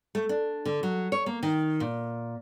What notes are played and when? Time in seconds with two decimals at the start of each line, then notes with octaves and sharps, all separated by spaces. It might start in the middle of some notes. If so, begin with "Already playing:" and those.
0.15 A3
0.29 D4
0.65 D3
0.83 F#3
1.12 C#5
1.26 A#3
1.43 D#3
1.80 A#2